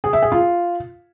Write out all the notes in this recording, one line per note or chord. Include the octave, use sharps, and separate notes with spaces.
G#4
E5
G#4
F4